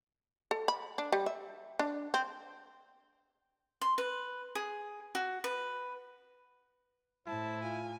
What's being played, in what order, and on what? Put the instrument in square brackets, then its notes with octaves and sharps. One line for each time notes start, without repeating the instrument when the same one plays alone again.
[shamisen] A4
B5
D4
G3
E5
D4
C4
[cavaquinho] C6
B4
G#4
F#4
B4
[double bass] A2 [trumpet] E4 [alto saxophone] C5 [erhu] A5
[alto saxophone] F4 [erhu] G#5